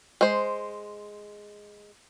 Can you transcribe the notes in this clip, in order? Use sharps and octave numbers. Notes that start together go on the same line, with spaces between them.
G#3 C5